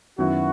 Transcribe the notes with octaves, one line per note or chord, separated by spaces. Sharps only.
F#2 D#3 F#3 B3 E4 F#4